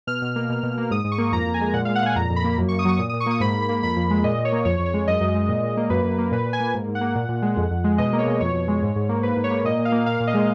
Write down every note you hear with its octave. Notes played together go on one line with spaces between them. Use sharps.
B2 F6
B2
A#3
B2
B2
A#3
G#2 D#6
G#2
C#6
A#3
F2 A#5
F2
G#5
G#3
A#2 F#5
F5
G#3
F#5
A#2 G#5
F2 A#5
F2
B5
A#3
F#2
C#6
A#3
D#6
F#3 C#6
A#2 D#6
D#6
A#2
C#6
A#3 D#6
G#2 B5
G#2
B5
A#3
F2 B5
F2
G#3
A#2 D#5
A#2
C#5
A#3
F2 C#5
F2
C#5
G#3
F#2 D#5
F#2
G#3
A#2
A#2
A#3
F#2 B4
F#2
A#3
A#2 B4
A#2
G#5
A#3
G#2
G#2
F#5
A#3
A#2
A#2
G#3
F2
F2
G#3
B2 D#5
A#3
C#5
B2
F2 C#5
F2
G#3
G#2
G#2
A#3
G#2 B4
G#2
C#5
A#3
A#2 D#5
A#2
F5
A#3
A#2 F5
A#2
D#5
G#3